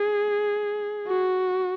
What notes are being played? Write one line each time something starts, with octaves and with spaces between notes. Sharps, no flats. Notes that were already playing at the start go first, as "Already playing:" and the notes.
Already playing: G#4
F#4